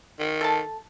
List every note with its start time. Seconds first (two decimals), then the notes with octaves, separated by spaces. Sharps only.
0.19 D#3
0.41 A4 A5